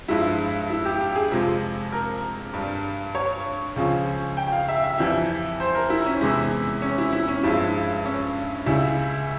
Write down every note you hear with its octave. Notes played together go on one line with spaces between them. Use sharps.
G2 F3 G#3 E4
E4
G4
G4
G#4
F2 C3 F3 G#3
A#4
G2 G3
C#5
C#2 C#3 F3
G5
F5
E5
E5
F2 E3 G3 E5
C5
A#4
E4
C#4
E2 C3 E3 G#3 E4
C#4
E4
E4
C#4
G2 F3 G#3 E4
C#4
C#2 C#3 G3 E4